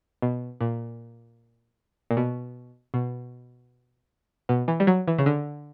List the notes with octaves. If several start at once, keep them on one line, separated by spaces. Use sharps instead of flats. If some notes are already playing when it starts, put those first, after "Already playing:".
B2
A#2
A#2
B2
B2
B2
E3
G3
F#3
E3
C#3
D3